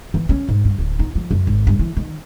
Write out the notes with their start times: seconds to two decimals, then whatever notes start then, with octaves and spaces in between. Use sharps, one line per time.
0.14 E3
0.29 C#4
0.49 G#2
0.65 G2
0.78 D1
0.99 D#4
1.15 F3
1.31 F#2
1.47 G#1
1.67 G2
1.79 E3
1.97 D#3